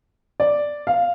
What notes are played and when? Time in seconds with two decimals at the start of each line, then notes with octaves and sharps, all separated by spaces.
0.40 D5
0.87 F5